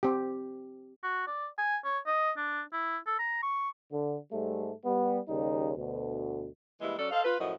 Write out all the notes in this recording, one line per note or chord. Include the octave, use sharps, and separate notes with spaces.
C4 G4
F#4
D5
G#5
C#5
D#5
D4
E4
A4
A#5
C#6
D3
G#2 G3 A3
G3 B3
D#2 C#3 G3 D#4
D2 B2
E3 G3 G#3 A#3 E4
F#3 C#4 A4 D5
A4 C5 D#5 F5
F4 B4
F#2 A2 F3 F#4 D#5